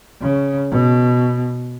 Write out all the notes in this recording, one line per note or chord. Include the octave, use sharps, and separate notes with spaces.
C#3
B2